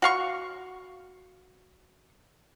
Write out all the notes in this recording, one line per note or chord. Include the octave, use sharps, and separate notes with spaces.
F#4 F5 C#6